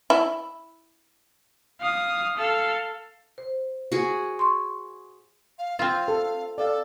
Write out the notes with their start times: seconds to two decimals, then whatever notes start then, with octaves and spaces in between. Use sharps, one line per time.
0.10 E4
1.80 F5 D#6
2.37 A4 F5
3.38 C5
3.92 F#4 G#4
4.39 C6 C#6
5.58 F5
5.79 C4 F4 F5
6.08 A4
6.58 A4 D5 F5